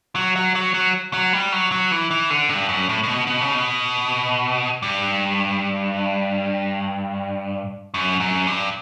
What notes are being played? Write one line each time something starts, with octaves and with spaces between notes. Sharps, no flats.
F#3
F#3
F#3
F#3
F#3
G3
F#3
F#3
E3
E3
D3
G2
F#2
A2
A2
B2
B2
C#3
B2
G2
F#2
F#2
G2